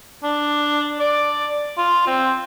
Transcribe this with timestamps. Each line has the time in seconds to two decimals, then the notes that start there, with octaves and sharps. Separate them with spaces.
0.24 D4
1.00 D5
1.78 F4
2.07 C4